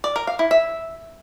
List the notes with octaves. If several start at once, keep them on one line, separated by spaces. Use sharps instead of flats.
D5
A#4
F5
E4
E5